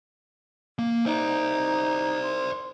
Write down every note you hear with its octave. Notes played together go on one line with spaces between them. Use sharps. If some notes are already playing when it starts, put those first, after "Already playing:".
A#3
D#4 C5 D5
C6